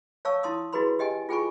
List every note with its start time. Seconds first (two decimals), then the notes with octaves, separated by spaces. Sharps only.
0.25 C#5 F5 A5 C#6 E6
0.43 E4 A5 C6 D#6
0.73 E4 F#4 G#4 B4 B5 C6
0.99 G4 D#5 G5 G#5
1.29 F4 G#4 G5 G#5 B5 C#6